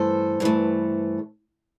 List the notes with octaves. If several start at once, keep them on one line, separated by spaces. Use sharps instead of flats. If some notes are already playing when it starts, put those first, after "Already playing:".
Already playing: G2 E3 A3 A4 C5
G2 E3 A3